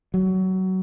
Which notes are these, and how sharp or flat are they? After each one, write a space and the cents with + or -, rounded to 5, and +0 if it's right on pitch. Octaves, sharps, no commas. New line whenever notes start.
F#3 +20